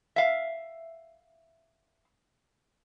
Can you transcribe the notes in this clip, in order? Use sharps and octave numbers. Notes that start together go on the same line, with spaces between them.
E5 F5